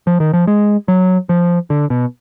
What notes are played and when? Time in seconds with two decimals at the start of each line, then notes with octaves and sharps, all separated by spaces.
0.07 F3
0.20 D#3
0.33 F3
0.47 G#3
0.88 F#3
1.29 F3
1.70 D3
1.90 B2